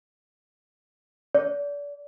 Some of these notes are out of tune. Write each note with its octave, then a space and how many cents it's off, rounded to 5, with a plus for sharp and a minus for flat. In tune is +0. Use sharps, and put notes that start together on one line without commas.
D5 -30